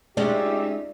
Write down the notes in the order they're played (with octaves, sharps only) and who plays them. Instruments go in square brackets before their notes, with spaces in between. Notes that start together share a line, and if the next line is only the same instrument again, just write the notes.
[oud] G#3 C#4 [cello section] D#4 F4 E5 [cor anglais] G4 [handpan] D5